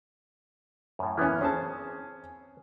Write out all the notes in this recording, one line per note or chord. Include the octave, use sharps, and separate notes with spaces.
F#2 A2
E3 A#3 B3 C#4
C4 C#4 G#4 C5 A5